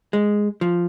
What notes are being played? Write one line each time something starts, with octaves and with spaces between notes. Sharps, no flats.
G#3
F3